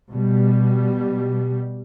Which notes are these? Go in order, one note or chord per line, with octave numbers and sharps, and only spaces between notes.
B2 G3